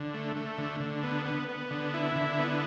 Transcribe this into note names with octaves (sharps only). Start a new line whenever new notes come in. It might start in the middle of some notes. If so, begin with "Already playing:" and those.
Already playing: D3
A3
A3
D3
D3
B3
B3
B3
D3
E4
D3
B3